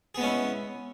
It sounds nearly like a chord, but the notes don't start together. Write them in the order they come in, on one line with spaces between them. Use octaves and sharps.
G#4 B3 G#3 C#4 E4